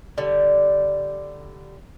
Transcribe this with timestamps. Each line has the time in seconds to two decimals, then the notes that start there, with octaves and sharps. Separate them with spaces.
0.18 D3 G3